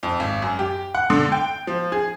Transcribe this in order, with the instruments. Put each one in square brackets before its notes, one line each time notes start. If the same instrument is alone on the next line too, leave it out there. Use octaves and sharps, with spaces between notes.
[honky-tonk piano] F2
G#1
F#2
G4
F#5
D3
G5
F3
G#4